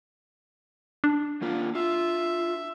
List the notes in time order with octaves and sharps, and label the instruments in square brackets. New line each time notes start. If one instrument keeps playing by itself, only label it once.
[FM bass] D4
[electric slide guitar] D#3 A#3 F4
[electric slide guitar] F4 [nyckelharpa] E5